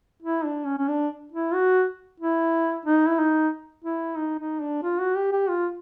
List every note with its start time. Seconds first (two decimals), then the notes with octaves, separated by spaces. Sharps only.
0.22 E4
0.44 D4
0.66 C#4
0.78 C#4
0.89 D4
1.32 E4
1.54 F#4
2.20 E4
2.85 D#4
3.08 E4
3.19 D#4
3.84 E4
4.17 D#4
4.39 D#4
4.61 D4
4.83 F4
5.00 F#4
5.16 G4
5.33 G4
5.49 F4